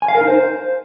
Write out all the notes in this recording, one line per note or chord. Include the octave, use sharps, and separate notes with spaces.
G#5
F5
A#4
D#4
C5